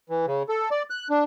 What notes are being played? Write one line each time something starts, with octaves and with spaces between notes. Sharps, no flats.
E3
C#3
A4
D5
F#6
D4